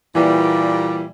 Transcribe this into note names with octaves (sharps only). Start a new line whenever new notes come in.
A#2 E3 G3